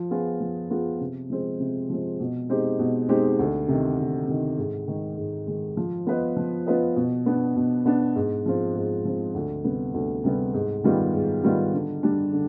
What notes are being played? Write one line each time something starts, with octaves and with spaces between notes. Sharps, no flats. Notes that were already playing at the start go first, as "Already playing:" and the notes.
Already playing: F3
B3 F4 G#4
F3
B3 F4 G#4
C3
F3 G#3 C4
C3
F3 G#3 C4
B2
G#3 C4 D#4 G4
B2
G#3 C4 D#4 G4
D2
C3 D#3
D2
C3 D#3
G#2
D#3 G#3
G#2
D#3 G#3
F3
B3 F4 B4 D#5
F3
B3 F4 B4 D#5
B2
B3 D4
B2
B3 D4
G#2
F3 G#3 C4 F4
G#2
F3 G#3 C4 F4
D2
C3 G3 B3
D2
C3 G3 B3
G#2
D#3 G3 B3 F4
G#2
D#3 G3 B3 F4
D3
G3 D4
D3